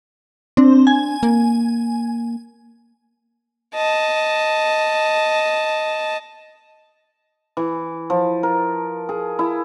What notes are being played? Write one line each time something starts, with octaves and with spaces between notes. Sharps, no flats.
C4 D4
G#5
A#3
D#5 A5
E3
F3
A#4
G#4
E4